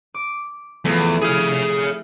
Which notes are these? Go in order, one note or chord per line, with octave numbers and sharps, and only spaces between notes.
D6
E2 F3 A3
E4 G4 G#4 F5